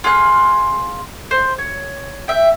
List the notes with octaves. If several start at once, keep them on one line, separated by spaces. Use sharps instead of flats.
F4 G#4 F6 F#6
C5
C#5
E5 G5